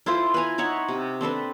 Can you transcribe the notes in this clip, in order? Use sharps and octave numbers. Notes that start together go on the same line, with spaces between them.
E4 F4 A4 C5
B4 C5 G#5 A#5
D#4 C#5 E5 F#5
C3
C4 D4 A4 B4